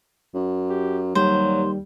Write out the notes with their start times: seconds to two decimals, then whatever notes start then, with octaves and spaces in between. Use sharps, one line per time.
0.34 F#2
0.70 G4
1.15 D#2 F#3 G3 C5